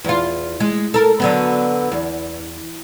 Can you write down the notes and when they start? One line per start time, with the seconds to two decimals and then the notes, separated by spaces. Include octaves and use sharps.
0.04 E2 F4
0.60 G#3
0.94 A4 A#4
1.20 D3 F#3 B3
1.92 E2